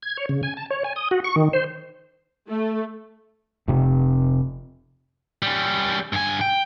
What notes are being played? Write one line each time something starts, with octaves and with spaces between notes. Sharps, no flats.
G#6
C#5
C#3
G#5
A5
C#5
G#5
D#6
F#4
C#6
D#3
C5
A3
F1 C3
G3 C#4
G2 G#5
G5